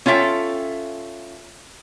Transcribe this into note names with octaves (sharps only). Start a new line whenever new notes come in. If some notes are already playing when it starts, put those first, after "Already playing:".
C#4 F4 A4 E5 G5